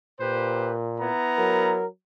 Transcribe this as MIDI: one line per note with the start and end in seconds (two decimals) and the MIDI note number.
0.20 1.08 46
0.20 0.73 67
0.20 0.73 71
0.20 0.73 72
0.99 1.79 59
0.99 1.79 64
0.99 1.79 82
1.37 1.85 54
1.37 1.85 70